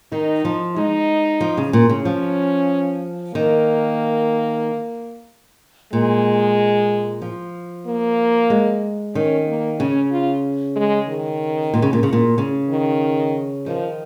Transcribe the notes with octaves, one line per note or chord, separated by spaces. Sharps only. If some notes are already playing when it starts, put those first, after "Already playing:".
D#3 D#4
F3
G#3 D#4
F3
C#3
A#2
C#3
F3 C#4
D#3 A#3
A#2 G#3
F3
A#3
G#3
D#3 C#4
A#3
C#3 C#4
F4
G#3
D#3
A#2
C#3
A#2
C#3
A#2
C#3
D#3
D#3 F3